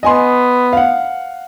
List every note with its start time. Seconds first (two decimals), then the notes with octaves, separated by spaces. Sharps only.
0.03 B3 D#5 G#5 C6
0.73 F5 F#5